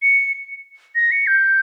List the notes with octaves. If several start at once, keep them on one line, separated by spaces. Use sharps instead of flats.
C#7
A#6
C#7
G6